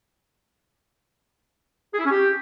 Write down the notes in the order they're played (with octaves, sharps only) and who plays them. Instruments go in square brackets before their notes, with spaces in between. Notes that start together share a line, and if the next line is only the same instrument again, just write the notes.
[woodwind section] G#4
E4
C#4
G4